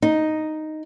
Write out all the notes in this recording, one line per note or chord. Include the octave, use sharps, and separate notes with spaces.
D#4